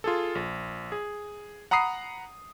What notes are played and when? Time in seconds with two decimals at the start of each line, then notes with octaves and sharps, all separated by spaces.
0.04 F4 G#4 A4
0.35 A#1
0.92 G#4
1.71 F#5 A#5 B5 D#6 C7